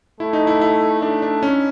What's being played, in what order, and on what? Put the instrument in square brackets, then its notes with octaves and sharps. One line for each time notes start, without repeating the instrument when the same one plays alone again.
[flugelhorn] A3 [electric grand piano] E4
[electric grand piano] D#4
E4
E4
[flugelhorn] A3 [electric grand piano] D4
[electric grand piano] D4
C#4